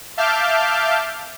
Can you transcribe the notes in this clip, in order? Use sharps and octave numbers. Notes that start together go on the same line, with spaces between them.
E5 F5 A5 D6 F6 G6